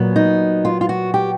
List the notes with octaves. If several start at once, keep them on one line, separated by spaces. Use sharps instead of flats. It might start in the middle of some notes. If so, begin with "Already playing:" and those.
Already playing: A#2 F#3 B3
D#4
F4
F4
F#4
G4